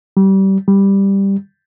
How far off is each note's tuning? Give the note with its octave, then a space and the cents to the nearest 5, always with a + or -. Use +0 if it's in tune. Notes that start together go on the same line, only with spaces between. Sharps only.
G3 -25
G3 +5